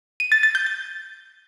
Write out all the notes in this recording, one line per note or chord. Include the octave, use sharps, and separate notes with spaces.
D#7
A6
A6
G6
A6